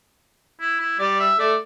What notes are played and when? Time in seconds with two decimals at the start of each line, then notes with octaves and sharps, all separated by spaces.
0.60 E4
0.80 E4
0.99 G3 D5
1.20 E5
1.39 A3 D5